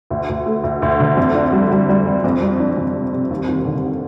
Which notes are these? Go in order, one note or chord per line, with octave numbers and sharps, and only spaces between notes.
D2
D2
A3
D2
D2
D3
F2
D4
G3
G3
G3
F2
F2
G3
D4
F2
C3
C3
D#2
D#2
D3